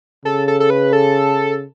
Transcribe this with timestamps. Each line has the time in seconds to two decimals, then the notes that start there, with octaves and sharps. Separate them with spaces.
0.25 C#3 A4
0.48 A4
0.60 A4
0.70 B4
0.93 A4